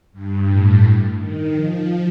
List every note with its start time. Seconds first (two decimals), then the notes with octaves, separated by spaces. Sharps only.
0.12 G2
0.47 A2
1.18 D#3
1.53 F3